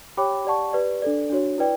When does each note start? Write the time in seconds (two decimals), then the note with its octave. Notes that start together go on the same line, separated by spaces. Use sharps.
0.17 G4 C#5 G5 B5 D6
0.45 G4 D5 F#5 A5 C#6
0.73 G4 B4 D5
1.02 D4 A4 D5
1.30 D4 F#4 C#5
1.58 E4 B4 D5 G5